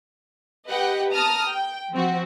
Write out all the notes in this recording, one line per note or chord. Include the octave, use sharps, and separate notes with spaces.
G4 B4 D#5 F#5 G5
A5 A#5 D#6 F6
G5
F3 C4 F#4